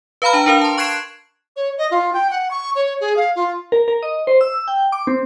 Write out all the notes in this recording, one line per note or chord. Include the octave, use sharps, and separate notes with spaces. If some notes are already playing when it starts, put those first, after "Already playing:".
B4 F5 A#5 B5 F6
D4 A5 A#5
D4 A#4 F5 F7
A5 C6
C#6 F#6 G#6 C7 D7 E7
C#5
D#5
F4
G5
F#5
C#6
C#5
G#4
F5
F4
A#4
A#4
D#5
C5
E6
G5
D6
C4